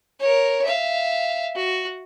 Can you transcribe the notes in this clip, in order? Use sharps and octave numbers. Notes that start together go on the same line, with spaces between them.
A#4 C#5
E5 F5
F#4